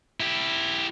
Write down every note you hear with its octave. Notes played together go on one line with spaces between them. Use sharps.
E4 G4